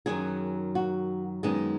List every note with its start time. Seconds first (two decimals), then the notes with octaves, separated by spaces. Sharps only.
0.06 F#2 D#3 F#3 G#4
0.75 F#4
1.43 F#2 D#3 G#3 B3 D#4 G#4